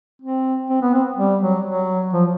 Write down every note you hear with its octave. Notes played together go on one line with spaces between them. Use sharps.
C4
C4
B3
C4
G3
F#3
F#3
F3